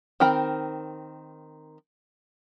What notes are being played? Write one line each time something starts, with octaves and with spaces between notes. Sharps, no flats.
D#3 C4 A#4 G5 B5